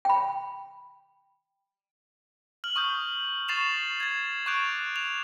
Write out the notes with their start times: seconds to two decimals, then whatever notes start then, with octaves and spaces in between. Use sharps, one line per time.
0.05 G5 B5
2.64 F6 F#7
2.76 C#6 D#6 G6
3.48 C#6 A6 C7 E7 F7
4.00 G#6 A6
4.46 C#6 D6 F#6 G6 D7 F7
4.96 F7